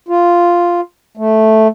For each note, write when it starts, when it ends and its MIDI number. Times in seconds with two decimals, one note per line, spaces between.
0.09 0.81 65
1.17 1.68 57